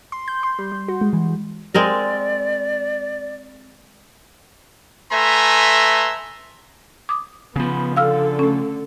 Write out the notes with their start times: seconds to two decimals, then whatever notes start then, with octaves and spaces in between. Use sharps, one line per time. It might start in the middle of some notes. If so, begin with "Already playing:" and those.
0.12 C6
0.28 G6
0.43 C6
0.59 G3
0.72 G3
0.88 F#4
1.01 G#3
1.13 E3
1.74 G#3 C4 A#4 D5
5.12 A3 B4 E5 G#5 A#5 C6
7.09 D6 D#6
7.56 C#3 F3 B3
7.97 D3 A4 F5 E6 F6
8.39 A3 C#4